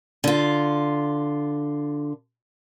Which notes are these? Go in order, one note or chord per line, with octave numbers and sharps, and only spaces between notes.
D3 F4